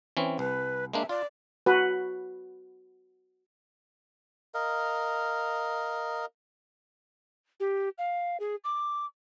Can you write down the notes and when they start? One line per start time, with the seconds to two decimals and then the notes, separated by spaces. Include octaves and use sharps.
0.17 E3 C4 C#4
0.39 C2 B4
0.93 G#3 A#3 D4 E5
1.09 F4 D5
1.66 F#4 B4
4.54 A#4 D#5 F5
7.60 G4
7.98 F5
8.40 G#4
8.64 D6